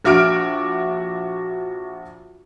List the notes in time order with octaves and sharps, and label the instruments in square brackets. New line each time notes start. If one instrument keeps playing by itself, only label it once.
[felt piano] A#1 F#4 E5 D6 F6 D7